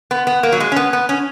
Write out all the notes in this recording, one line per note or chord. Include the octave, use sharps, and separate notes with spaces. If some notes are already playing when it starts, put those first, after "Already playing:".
B3
B3
A#3
F#3
G#3
C#4
B3
B3
C#4